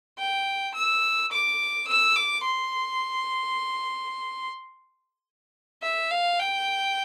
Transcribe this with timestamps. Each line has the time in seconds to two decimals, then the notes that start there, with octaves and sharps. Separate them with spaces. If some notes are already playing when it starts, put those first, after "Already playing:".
0.19 G5
0.74 E6
1.32 D6
1.88 E6
2.16 D6
2.45 C6
5.83 E5
6.11 F5
6.39 G5